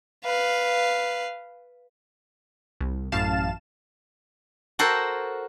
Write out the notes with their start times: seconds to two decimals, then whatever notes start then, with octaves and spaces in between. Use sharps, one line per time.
0.25 B4 F5
2.81 C2
3.12 A1 F#2 F5 A5 E7
4.79 F#4 A4 A#4 C5